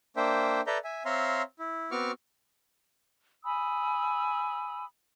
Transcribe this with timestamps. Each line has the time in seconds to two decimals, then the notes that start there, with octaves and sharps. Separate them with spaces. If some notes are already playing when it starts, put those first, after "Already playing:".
0.17 A#3 D4 C5 E5 G5
0.67 A4 B4 D5 E5 A#5 G6
0.84 E5 G#5
1.05 C4 C#5 E5 F5 A#5 C6
1.59 E4
1.91 B3 C4 F#4 C#6 D6 F6
3.44 G#5 B5 D#6 E6